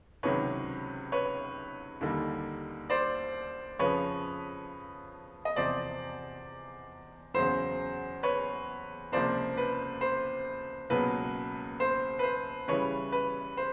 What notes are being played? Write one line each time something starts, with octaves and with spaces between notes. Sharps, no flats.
C#2 C3 D#3 F#3 B4 C#5
B4 C#5
D#2 D3 G3 A#3 D#4
C5 D5
F2 C#3 F3 B4 C#5
D#5
E2 C3 F3 C5 D5
E2 C#3 F#3 C5
B4 C#5
C#2 C3 F3 A#3 C5 D5
B4
C5
C#2 B2 F#3 A#3 B4
C5
B4
C5
C#3 E3 G3 B4 C#5
B4
C5